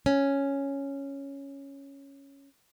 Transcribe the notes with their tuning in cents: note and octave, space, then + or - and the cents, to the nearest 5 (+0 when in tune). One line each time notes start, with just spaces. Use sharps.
C#4 +0